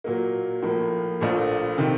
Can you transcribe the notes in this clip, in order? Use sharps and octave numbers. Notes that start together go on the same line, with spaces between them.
A#2 F#3 A#3
A2 F3 A#3
A#1 A#2 A3
C3 D#3